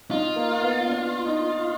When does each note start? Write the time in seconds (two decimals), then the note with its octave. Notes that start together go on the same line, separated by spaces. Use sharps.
0.11 D#4 F4
0.36 A#3
0.61 B3
0.87 D4
1.25 D#4